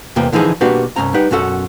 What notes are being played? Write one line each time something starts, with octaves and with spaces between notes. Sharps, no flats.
E2 C3 A#3 B4 G5
D3 E3 F3 D#4 G#4
B2 A#3 D4 F#4 G4 B4
C2 G2 C#4 A#5
G3 D#4 G4 B4 F#5
B1 F#2 C#4 F#4 A4 F#5